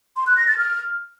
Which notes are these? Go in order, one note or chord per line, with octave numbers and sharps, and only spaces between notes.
C6
F#6
A#6
A6
F6